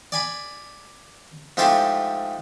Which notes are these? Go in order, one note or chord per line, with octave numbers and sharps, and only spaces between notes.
D5 G#5 B5
G#2 F3 A3 E4 F4 G4